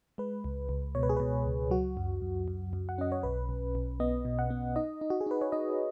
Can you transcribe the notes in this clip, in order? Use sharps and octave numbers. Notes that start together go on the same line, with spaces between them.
G#3 B4
C#2
C#2
B2 C#5
B4
G#4
B2 B4
C#2
F#3 F#4
F#2
F#2
F#2
F#2
F#5
C#4 D#5
C#5
B1 B4
B1
B1
B3 D#5
B2
F#5
B3
D#4 D#5
D#4
F#4
G#4
D#4 B4
C#5
D#4 D#5